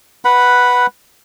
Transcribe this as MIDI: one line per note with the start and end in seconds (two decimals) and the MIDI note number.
0.25 0.86 71
0.25 0.86 78
0.25 0.86 83